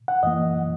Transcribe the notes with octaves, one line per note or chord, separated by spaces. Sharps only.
F#5
F#2 E3 A#3 D#5